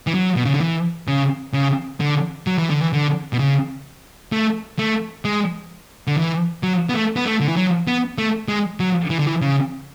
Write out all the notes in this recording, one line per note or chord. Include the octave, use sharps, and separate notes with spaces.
E3
F#3
B2
C#3
D3
E3
C#3
C#3
D3
F#3
E3
D3
E3
D3
B2
C#3
A3
A3
G#3
D3
E3
F#3
B3
A3
B3
A3
D3
E3
F#3
B3
A3
G#3
F#3
E3
D3
E3
C#3